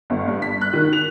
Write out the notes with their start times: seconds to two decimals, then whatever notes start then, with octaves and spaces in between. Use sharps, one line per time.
0.10 G1
0.28 G2
0.42 B6
0.61 F#6
0.73 D#3
0.93 F7